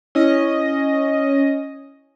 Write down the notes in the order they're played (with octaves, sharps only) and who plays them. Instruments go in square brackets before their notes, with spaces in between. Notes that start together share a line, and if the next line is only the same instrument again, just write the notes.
[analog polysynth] C#4 D#5 [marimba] E4